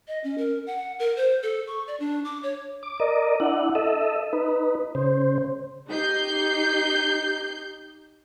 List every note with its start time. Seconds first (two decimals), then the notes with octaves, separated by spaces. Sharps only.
0.08 D#5
0.24 C#4
0.38 A#4
0.67 F#5
0.99 A#4
1.17 C5
1.43 A4
1.67 C#6
1.87 D5
2.00 D4
2.25 D6
2.43 C#5
2.83 D6
3.00 A#4 D5 D#5
3.40 D4 E4 F#5
3.75 A4 D#5 E5
4.33 D#4 B4
4.95 C#3 C5
5.89 D#4 G4 G6 C7